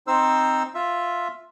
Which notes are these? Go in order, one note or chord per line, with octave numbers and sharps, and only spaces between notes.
C4 D#4 C5 E6
F4 E5